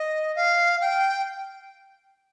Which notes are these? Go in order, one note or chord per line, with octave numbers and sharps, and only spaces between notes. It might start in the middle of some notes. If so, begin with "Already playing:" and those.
Already playing: D#5
F5
G5